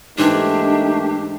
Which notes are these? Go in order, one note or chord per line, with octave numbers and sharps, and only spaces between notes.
G#2 E3 A3 A#3 D4 D#4 G4